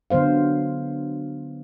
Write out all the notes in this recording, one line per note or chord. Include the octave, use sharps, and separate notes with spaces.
D3 F#3 B3 C5 F5